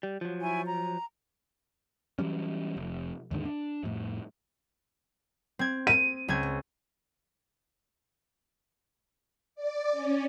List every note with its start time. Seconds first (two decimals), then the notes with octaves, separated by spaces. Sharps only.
0.03 G3
0.21 F3 F#3
0.42 E4 G#5 C#6
0.66 A#5
2.19 E3 F#3 G3 C#4
2.77 F1
3.31 D#2 G#2 D3 D#3
3.45 D4
3.83 F2 A2
5.59 C4 G#6
5.87 D#7
6.28 C#2 C4 G#6
9.55 D5
9.92 C#4